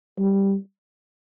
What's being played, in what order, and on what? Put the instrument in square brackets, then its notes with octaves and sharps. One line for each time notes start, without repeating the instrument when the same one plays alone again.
[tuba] G3